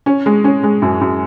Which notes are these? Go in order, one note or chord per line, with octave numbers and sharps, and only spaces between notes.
C#4
G#3
C#4
G#3
F#2
F#2